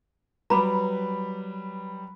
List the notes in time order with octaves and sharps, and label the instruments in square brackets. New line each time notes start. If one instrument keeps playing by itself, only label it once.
[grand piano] F#3 G3 D6 [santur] B4 [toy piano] A#5 B5